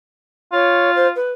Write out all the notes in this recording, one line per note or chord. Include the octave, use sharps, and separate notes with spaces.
F4 C#5
C5
B4